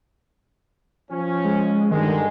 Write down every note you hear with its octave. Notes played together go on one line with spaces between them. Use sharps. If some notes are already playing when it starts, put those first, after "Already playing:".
F3 C#4
G#3
G2 D3 D#3 G#3